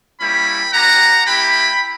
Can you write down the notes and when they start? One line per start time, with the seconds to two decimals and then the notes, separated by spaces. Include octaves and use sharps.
0.20 G3 A#3 C#4 E4 G5 B5
0.73 C#4 G4 F#5 A#5
1.26 A#3 E4 G4 G5 B5